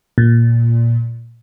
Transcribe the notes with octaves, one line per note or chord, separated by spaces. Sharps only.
A#2